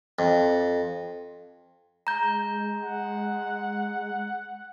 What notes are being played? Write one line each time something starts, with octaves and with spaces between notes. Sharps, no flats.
F2
G#3 A#5 G6
F#5